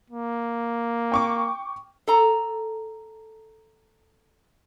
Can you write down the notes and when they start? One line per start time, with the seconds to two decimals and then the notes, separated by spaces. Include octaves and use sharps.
0.10 A#3
1.12 G5 C#6 D6
2.07 A4 A#5